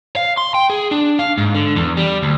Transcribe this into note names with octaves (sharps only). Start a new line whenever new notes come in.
F5
C6
G5
G#4
D4
F5
G#2
D3
E2
G3
D2